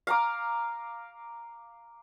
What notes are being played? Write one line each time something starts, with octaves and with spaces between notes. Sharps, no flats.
F5 A#5 D6